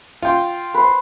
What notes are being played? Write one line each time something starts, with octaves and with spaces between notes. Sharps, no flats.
F4 G5
B4 C5